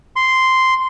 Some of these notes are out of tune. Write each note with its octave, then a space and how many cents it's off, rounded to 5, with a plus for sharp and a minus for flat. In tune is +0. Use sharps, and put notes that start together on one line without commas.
C6 -5